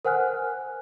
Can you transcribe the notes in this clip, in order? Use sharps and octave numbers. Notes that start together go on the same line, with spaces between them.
A#4 C5 F#5 G#5 F6 F#6